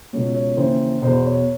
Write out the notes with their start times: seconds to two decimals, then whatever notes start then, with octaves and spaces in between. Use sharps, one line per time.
0.13 C#2 B2 C#5
0.35 C#5
0.57 D#2 C#3 E3 C5
1.02 E2 B2 C5
1.25 C#5